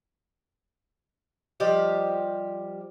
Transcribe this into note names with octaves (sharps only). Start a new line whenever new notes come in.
F3 G3 G4 D#5